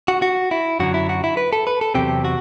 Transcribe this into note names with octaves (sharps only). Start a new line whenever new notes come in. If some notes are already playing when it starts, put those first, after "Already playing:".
F#4
F#4
E4
F#2 D3 F#3 F#4
E4
F#4
E4
B4
A4
B4
A4
E2 C3 F#3 C4 G4
F#4